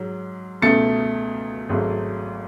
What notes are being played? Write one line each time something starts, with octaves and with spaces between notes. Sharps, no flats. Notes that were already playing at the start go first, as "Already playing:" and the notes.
Already playing: G#2 F#3
C#2 B2 A3 A6 C#7
G#1 G#2 F#3 A3